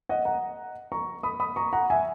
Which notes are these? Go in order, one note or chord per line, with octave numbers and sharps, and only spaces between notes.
D#5 F#5
F#5 A#5
A#5 C#6
B5 D#6
B5 D#6
A#5 C#6
F#5 A#5
E5 G#5